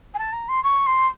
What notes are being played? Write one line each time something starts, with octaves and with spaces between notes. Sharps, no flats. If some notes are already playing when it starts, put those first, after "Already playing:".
G#5
A5
A#5
C6
C#6
C6